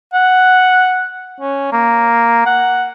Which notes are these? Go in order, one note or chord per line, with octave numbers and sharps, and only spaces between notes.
F#5
C#4
A#3
F#5